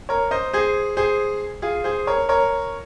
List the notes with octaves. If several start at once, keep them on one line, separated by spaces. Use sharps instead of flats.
A#4 C#5
C5 D#5
G#4 C5
G#4 C5
F4 G#4
G#4 C5
A#4 C#5
A#4 C#5